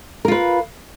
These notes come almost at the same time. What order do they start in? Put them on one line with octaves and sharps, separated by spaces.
A#4 F4 B4